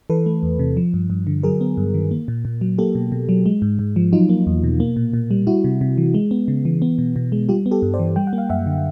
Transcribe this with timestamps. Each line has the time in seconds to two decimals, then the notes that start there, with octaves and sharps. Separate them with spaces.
0.10 E3 A4 B4
0.26 A3
0.43 E2
0.59 C3
0.77 F3
0.94 G2
1.10 G2
1.27 D3
1.43 F#3 G#4 A#4
1.61 B3
1.77 G2
1.94 D#3
2.11 A#3
2.28 A#2
2.45 A#2
2.61 F#3
2.78 A#3 G4 A4
2.95 B2
3.12 B2
3.29 F#3
3.46 G#3
3.62 G#2
3.79 G#2
3.96 F3
4.13 F#3 D#4 F4
4.29 A#3
4.47 E2
4.64 B2
4.80 A#3
4.96 A#2
5.13 A#2
5.31 G3
5.47 G3 E4 F#4
5.64 C3
5.81 C3
5.98 E3
6.14 G#3
6.31 B3
6.48 C#3
6.65 E3
6.82 B3
6.98 B2
7.16 B2
7.32 G#3
7.49 G3 F4 G4
7.66 B3
7.71 G4 A4
7.82 G2
7.94 C5 D5
7.99 E3
8.16 G3 G5
8.27 F#5
8.33 A#3
8.38 F5
8.49 F#2 E5 F#5
8.66 D3